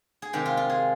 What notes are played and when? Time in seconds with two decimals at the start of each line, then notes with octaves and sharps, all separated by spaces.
0.22 G#4
0.33 C3 D#3 G#3 D#4 G4
0.46 F4
0.57 F4
0.70 G#4